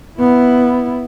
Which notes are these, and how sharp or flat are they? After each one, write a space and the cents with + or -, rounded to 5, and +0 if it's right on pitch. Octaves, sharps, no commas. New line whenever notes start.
B3 +0 E4 +0